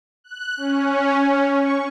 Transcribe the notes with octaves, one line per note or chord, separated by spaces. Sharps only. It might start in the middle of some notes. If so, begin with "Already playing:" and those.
F#6
C#4
C#4
C#6